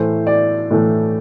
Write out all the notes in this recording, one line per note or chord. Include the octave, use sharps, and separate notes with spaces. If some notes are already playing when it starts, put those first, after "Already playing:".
Already playing: A2 E3 A3 C5
D5
A2 E3 A3